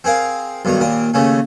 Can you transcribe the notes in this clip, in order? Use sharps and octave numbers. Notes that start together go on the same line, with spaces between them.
C4 G#4 A#4 F5
B1 G2 D#3 A#5
D#2 A#2 A#4
D#2 C#3 A3 C#4